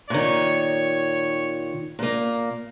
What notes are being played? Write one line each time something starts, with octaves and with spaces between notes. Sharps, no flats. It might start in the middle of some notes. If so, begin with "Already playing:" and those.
A#2 D#3 C#5
A#2 A#3